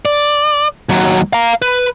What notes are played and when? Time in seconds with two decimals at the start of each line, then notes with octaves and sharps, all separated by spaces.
0.05 D5
0.89 D#2 F#3
1.33 F5 A#5
1.62 B4